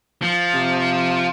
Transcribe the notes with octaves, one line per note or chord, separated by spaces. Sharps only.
F3
C3